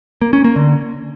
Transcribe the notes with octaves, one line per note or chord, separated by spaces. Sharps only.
A#3
C#4
A#3
D3